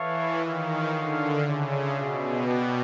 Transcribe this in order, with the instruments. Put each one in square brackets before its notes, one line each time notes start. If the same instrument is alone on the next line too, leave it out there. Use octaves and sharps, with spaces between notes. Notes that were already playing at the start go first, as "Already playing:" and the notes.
Already playing: [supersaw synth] E3 [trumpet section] E4 A4 C#5 F5
[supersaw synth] D#3 [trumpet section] F4 G#4 C#5 F5
[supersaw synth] D3
[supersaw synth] C#3 [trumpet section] D4 F4 G#4 C#5 E5
[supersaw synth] B2
[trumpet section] F#4 B4 D5 G5